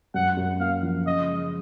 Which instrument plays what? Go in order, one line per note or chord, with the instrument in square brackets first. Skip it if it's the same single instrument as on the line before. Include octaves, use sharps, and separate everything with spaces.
[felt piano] F#2 [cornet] F#5
[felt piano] F#2
[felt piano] A#3 [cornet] F5
[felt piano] F3
[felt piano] C#3 [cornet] D#5
[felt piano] G#3